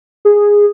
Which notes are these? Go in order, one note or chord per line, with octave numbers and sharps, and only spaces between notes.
G#4